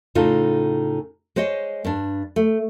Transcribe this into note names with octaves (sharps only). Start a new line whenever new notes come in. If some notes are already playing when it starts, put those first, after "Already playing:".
A2 C#3 D#4 F4 A4
G#3 C5 C#5 D#5
G2 D4
A3